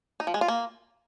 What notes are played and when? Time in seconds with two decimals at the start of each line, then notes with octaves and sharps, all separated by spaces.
0.20 D#4
0.27 F3
0.34 G#3
0.41 F4
0.48 A#3